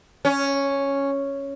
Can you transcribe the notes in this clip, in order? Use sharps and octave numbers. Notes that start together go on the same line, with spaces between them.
C#4